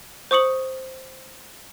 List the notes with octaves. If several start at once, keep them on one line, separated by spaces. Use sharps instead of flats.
C5 C#6 D#6 C#7 F#7